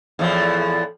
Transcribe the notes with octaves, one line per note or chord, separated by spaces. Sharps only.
E2 A2 F3